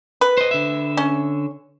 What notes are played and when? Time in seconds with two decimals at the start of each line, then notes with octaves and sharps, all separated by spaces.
0.21 B4
0.38 C5 D#5
0.51 D3 E5
0.97 C#4